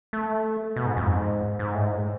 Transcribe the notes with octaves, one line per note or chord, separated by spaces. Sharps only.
A3
B2
G#2
F2
G#2
G#2
A2
G#2